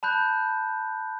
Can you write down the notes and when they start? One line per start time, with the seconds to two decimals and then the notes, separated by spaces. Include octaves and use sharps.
0.03 A5 B5 F#6 G6